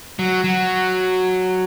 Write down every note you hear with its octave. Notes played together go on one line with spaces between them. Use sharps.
F#3
F#3